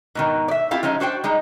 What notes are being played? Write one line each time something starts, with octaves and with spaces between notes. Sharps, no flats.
G#2 B2 D#3
D5 E5
C4 E4 F4 G4 F5
F3 G#3 C#4 D#4 F#4
D4 F#4 C5 G5
G3 G#3 D#4